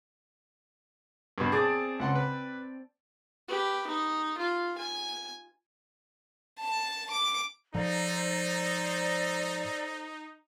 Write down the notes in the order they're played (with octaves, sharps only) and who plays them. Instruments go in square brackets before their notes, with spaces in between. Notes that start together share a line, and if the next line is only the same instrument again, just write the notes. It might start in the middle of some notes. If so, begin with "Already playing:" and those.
[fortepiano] G2 B2
[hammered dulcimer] C4 D5 A5 [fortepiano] G#4
[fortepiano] C#2 F#5 C6
B4
[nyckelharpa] G4 B4
D#4
F4
G#5
[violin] A5
D6
[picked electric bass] G#2 F3 [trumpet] D#4 [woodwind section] A4 C5 A#5 [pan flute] D5